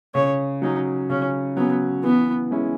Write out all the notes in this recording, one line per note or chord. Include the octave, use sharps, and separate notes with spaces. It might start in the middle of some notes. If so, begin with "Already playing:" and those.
C#3 C#5
F#3 C#4 D#4
C#3 C#4
F#3 B3 C#4
E3 B3
G#3 C#4 E4